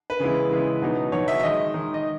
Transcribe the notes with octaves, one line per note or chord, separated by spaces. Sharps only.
B4
C#3 E3 G#3 B3 E4
C#3 E3 G#3 B3 E4
B2 F#3 B3 D#4
B2 F#3 B3 D#4 C#5
E5
E5
D#3 G#3 D#4 D#5
D#3 G#3 D#4
D#5